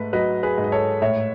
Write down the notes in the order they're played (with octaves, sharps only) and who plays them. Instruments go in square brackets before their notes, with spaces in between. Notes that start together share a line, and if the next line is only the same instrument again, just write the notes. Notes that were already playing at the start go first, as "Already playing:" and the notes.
Already playing: [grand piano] G#2 A3 B4
F#3 B4 D#5
G#4 B4
G#2
D#5
A4 C#5
A2 C#5 E5